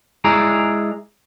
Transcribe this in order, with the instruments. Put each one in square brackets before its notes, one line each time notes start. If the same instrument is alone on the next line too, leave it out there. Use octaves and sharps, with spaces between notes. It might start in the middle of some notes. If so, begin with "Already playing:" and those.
[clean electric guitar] G#3 E4 G#4 D5 A#5